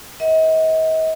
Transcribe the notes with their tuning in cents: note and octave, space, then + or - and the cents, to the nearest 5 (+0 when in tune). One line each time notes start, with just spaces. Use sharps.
B4 -45 D#5 +40 F#5 +0